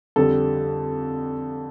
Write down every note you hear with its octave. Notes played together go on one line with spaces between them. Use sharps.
F2 D3 G3 A4